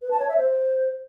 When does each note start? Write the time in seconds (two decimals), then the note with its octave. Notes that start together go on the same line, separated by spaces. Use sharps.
0.02 B4
0.11 A5
0.20 C#5
0.28 E5
0.37 C5